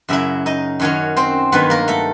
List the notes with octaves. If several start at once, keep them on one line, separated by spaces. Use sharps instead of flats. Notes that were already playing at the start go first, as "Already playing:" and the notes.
F#2 C#3 F#3 E4 E5
D#4 D#5
F#2 D#3 F#3 C#4 C#5
C4 C5
G2 D#3 F#3 B3 B4
A#3 A#4
A3 A4